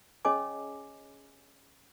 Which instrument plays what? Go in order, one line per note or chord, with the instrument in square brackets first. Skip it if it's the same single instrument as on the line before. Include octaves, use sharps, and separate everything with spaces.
[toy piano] C#4 G#4 C#5 D#5 G#5 D6